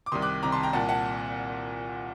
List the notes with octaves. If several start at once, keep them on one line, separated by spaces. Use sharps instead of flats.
D6
C2 C3 D#3 C6 D#6
D6 F#6
C2 C3 D#3 A#5 D6
A5 C6
G5 A#5
C2 A#2 F#5 A5
F#5 A5